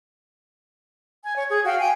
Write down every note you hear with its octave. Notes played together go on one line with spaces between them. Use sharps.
G#5
C#5
G#4
F#4 F5 G5
G5 G#5